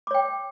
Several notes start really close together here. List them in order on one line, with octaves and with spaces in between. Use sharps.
D6 C#5 G5